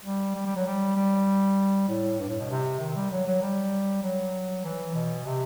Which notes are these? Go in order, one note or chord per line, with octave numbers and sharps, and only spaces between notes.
G3
G3
G3
F#3
G3
G3
A2
G2
A2
B2
C3
D#3
G3
F#3
F#3
G3
F#3
E3
B2
C3